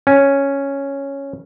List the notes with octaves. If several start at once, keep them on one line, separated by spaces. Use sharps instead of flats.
C#4